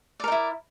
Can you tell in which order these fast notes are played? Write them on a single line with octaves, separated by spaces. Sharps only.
D5 A#4 D#4 E4